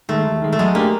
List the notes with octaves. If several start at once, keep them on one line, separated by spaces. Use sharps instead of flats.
D#3 G#3 A3
D#2
D#3 G#3
A3
F#3 G#3
A3 A#3 D4 G4